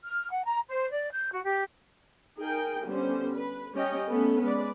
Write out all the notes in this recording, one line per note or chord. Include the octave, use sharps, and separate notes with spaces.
F6
F#5
A#5
C5
D5
G6
F#4
G4
D#4 G#4 A#4 G5
D3 G3 B3 C#4 C5
B4
G3 C#4 C#5 D#5 G5
A3 B3 C#4 A4
G#3 B4 D5